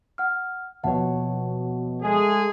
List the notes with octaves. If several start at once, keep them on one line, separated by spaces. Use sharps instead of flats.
F#5 F6
D#2 B2 F3 C#5 E5 F#5 A5
G#3 A3 G#4